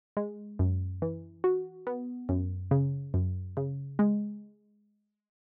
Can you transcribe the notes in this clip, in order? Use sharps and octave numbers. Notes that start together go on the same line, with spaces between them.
G#3
F#2
E3
F#4
B3
F#2
C#3
F#2
C#3
G#3